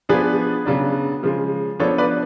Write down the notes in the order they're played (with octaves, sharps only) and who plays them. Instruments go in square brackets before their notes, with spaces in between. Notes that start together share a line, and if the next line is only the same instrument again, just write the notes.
[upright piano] F3 B3 D4 G#4 B4
C#3 F#3 B3 D4
C#3 F3 G#3
F3 B3 D4 A4 C#5
B4 D5